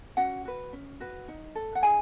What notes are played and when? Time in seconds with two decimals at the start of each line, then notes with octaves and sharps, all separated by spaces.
0.17 C#4 F#4 F#5
0.45 F#4 B4
0.73 C#4
1.00 F#4 B4
1.28 D#4
1.55 A4
1.75 F#5
1.83 D#4 G#4 G#5